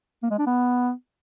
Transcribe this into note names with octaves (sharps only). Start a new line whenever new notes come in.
A#3
G#3
D4
B3